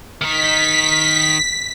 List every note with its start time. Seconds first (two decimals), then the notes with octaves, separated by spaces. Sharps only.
0.21 D#3 D#4 B6